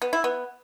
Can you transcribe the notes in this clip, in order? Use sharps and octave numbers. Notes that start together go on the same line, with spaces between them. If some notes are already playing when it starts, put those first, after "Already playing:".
B3
E4
B3